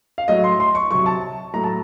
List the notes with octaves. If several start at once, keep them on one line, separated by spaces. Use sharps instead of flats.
F5
A2 F#3 D#5
C6
C6
C#6
C3 F#3 C#6
A5
A2 F#3 A#5
A5